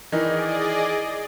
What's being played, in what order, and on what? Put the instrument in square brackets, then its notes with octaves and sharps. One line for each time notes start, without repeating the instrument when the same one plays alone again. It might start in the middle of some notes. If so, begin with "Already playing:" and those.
[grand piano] D#3 E3 D#4 [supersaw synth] G#4 D5 D#5